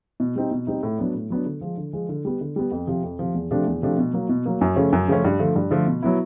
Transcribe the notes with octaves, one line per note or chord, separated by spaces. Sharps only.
B2
G3 C4 D#4
B2
G3 C4 D#4
A2
F#3 B3 D4
A2
F#3 B3 D4
D3
F3 G#3
D3
F3 G#3
D3
G3 B3
D3
G3 B3
F2
C3 F3
F2
C3 F3
E2
C3 F3 A3 D4
E2
C3 F3 A3 D4
B2
F#3 A#3
B2
F#3 A#3
F#2
C#3 F3 A3 C#4
F#2
C#3 F3 A3 C#4
G2
D3 F3 A3
G2
D3 F3 A3
B2
F#3 B3 E4